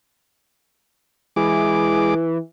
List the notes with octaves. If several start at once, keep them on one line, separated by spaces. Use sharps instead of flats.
E3 G#3 G#4 D6